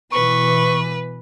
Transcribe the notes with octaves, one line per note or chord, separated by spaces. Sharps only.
B2 E3 B4 C#6